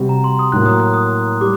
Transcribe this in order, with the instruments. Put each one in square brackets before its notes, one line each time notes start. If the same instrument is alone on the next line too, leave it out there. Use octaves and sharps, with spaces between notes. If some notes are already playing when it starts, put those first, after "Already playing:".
Already playing: [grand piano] C3 G3 C4 F#4
[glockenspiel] A#5
C6
D#6
[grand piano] A2 F#3 A#3 [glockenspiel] F#6
[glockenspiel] D#6
F#6
D#6
[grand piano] G3 [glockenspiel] D6